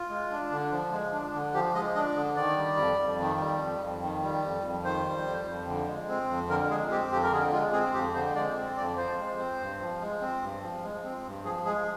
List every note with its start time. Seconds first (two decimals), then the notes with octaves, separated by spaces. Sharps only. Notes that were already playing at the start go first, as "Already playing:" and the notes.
Already playing: F4
0.09 G#3
0.31 D4
0.51 D3
0.72 F3
0.92 G#3
1.12 D4
1.33 D3
1.54 F3 G4
1.75 G#3 D#5
1.95 D4 D#5
2.16 D3
2.36 D#3 D5
2.57 G3
2.77 F2
2.98 F2
3.19 D#3
3.40 G3
3.60 F2
3.80 F2
4.02 D#3
4.22 G3
4.43 F2
4.64 F2
4.84 D#3 C5
5.05 G3
5.25 F2
5.46 F2
5.67 D3
5.87 G#3
6.08 C4
6.29 F2
6.49 D3 A#4
6.69 G#3 G#4
6.90 C4 G4
7.11 F2 G4
7.24 A#4
7.32 D3 G#4
7.52 G#3 F4
7.73 C4 G#4
7.94 F2 G4
8.14 D3 C5
8.34 G#3 D5
8.56 C4
8.76 F2 D5
8.96 F3 C5
9.17 G#3
9.39 C4
9.59 G2
9.80 F3
10.01 G#3
10.21 C4
10.41 G2
10.62 F3
10.83 G#3
11.04 C4
11.24 G2
11.45 F3 G#4
11.65 G#3 G#4